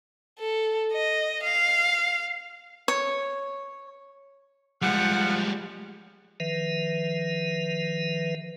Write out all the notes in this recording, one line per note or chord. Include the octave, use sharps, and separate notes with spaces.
A4
D#5
F5
C#5
F3 G3 G#3 F#5
D#3 F3 B4 E5